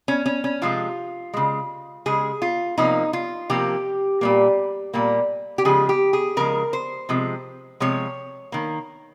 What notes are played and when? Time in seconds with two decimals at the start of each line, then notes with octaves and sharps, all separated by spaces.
0.08 C#4
0.26 C#4
0.44 C#4
0.62 C3 F3 G#3 F4
1.34 C#3 G#3
2.06 C#3 G#3 G#4
2.42 F4
2.78 C3 F3 A#3 D#4
3.13 F4
3.50 C3 F3 A#3 G4
4.21 A#2 G3 A#3
4.94 A#2 G3 A#3
5.58 G4
5.65 C#3 F3 G#3 G#4
5.89 G4
6.13 G#4
6.37 C#3 F3 G#3 A#4
6.73 C5
7.09 C3 F3 G#3
7.80 C3 F3 G#3 C#5
8.52 D#3 A#3